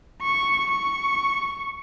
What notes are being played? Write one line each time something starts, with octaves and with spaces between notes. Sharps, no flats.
C#6
C#6